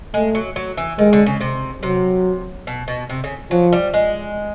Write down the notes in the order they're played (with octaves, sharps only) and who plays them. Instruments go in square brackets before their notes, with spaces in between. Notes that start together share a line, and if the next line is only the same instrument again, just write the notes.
[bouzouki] G#3 [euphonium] A3
[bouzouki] F#3
F#3
E3
[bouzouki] D#3 [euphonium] G#3
[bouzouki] D3
C#3
C3
[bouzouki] C3 [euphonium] F#3
[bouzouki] B2
B2
C3
C#3
[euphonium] F3 [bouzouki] F#3
[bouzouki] G3
G#3